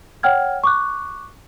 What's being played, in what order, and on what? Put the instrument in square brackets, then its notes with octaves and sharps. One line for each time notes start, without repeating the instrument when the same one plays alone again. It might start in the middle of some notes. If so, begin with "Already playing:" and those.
[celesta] C#5 F#5 G5 F6 G#6
C#6 D6 F#6